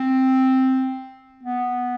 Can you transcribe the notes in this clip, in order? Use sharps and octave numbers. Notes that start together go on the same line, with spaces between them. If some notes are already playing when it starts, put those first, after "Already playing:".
Already playing: C4
B3